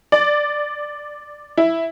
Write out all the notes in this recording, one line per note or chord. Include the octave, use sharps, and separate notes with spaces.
D5
E4